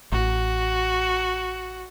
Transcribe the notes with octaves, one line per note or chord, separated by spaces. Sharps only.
A1 F#4